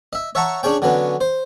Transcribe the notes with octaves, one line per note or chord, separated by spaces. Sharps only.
D#5 E5
C#5 E5 F#5 A5 A#5 C#6
C#4 D4 G#4 C#5 G5
D3 F#3 B3 C#4
C5